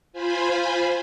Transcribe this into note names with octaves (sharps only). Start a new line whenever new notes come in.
F4 C5 G#5 B5